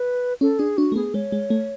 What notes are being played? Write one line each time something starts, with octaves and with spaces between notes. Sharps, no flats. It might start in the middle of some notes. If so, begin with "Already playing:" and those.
Already playing: B4
C#4 A4
D4 G#4
D4 F#4
A3
B3 G#4
G#3 C#5
G#3
A3